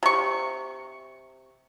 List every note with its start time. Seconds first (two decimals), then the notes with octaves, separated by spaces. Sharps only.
0.03 C3 C#6